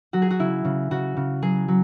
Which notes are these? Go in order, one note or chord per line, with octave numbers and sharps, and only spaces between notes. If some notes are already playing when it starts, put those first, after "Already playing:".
F#3 F#4
G#4
F#4
C#3 E4
C#3
C#3 F#4
C#3
F#3 G#4
F#3